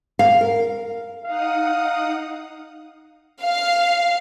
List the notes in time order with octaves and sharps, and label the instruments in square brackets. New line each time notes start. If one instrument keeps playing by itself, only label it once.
[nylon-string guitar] F5
A#4
[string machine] D#4 F#5 D#6 [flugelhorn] F5
[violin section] F5